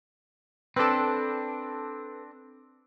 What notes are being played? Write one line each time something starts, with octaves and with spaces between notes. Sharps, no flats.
C4 D4 A4 B4